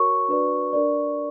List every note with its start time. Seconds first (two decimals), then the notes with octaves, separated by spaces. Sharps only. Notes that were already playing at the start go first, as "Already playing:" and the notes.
Already playing: F#4 A#4 C#5 C#6
0.28 D4 F#4 B4 D5
0.73 D4 A#4 D5